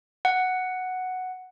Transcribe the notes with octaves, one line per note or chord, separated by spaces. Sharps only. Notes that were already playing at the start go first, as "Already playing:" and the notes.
F#5